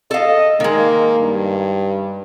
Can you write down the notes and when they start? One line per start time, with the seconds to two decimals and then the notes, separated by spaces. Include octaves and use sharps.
0.11 A4 D#5 F5
0.60 D#3 G#3 A#3
1.20 G2